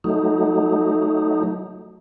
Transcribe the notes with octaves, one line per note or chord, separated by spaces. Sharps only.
F#3 A3 D#4